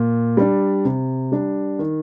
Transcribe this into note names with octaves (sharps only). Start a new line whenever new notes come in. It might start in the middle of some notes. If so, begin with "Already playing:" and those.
Already playing: A#2
G3 D4
C3
G3 D4
D#3